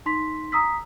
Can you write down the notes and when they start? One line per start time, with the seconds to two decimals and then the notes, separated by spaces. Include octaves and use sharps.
0.06 D#4 C6 B6
0.52 A#5 D#6 E6 B6